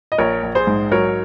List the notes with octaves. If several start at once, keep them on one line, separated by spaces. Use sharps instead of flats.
D#5
A#1 A#4 C#5
A#1
G#4 C5
G#2
F#3 A#4 C#5